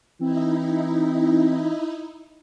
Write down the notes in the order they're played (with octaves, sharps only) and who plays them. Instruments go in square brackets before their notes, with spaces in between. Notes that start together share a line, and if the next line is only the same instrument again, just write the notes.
[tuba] E3 [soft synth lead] C4 [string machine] D#4 E4